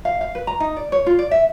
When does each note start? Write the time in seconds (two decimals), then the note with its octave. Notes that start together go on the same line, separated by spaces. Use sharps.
0.05 F5
0.21 F5
0.35 B4
0.47 A#5
0.60 D#4
0.76 D5
0.92 C#5
1.06 F4
1.19 D5
1.31 E5